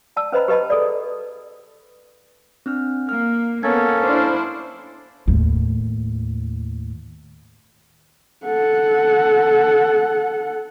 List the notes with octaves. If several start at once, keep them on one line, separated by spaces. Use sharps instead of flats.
D5 A5 E6
C#4 B4 C5 D#5 A#5 B5
G4 B4 D#5 A5 B5
G#4 A4 D5
A4
C4 D4 F6
A#3 F6
A#3 B3 C#4 A4 A#4 C#5 G#6
D4 E4 C5 D6 F6
D#2 A2
A4 F#5